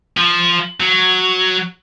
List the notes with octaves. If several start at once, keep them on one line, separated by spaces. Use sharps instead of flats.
F3
F#3